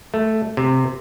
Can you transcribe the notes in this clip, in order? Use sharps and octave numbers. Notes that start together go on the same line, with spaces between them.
A3
C3